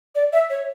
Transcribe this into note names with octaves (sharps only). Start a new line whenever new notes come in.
D5
E5
C#5